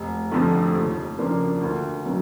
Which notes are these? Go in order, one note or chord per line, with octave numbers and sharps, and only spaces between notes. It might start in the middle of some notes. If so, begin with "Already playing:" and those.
Already playing: F1
F2 D3 F3 A3
D#2
C#3 F3 A#3 D4
D2
C#3 F#3 A#3